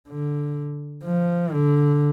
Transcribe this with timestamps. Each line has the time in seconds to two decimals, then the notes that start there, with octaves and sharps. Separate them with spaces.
0.09 D3
1.05 F3
1.52 D3